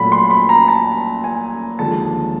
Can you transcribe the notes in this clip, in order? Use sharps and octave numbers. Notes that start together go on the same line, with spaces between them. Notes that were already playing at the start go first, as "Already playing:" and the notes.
Already playing: A#2 F#3 A3 B5
C6
B5
A#5
A5
G#5
D#2 D3 F3 G#3 A5